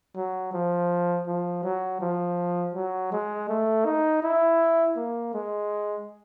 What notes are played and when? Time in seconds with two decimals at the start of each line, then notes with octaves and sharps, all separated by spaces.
0.16 F#3
0.53 F3
1.27 F3
1.64 F#3
2.01 F3
2.75 F#3
3.12 G#3
3.49 A3
3.86 D#4
4.23 E4
4.96 A#3
5.34 G#3